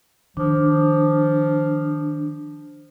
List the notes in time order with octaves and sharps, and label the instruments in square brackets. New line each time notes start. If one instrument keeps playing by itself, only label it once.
[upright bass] D#3 [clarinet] F3 [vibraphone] D4